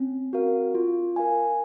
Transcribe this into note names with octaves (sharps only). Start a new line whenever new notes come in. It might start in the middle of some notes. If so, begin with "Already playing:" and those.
Already playing: C4 C#4
F#4 A#4 F5
F4
A#4 F5 G#5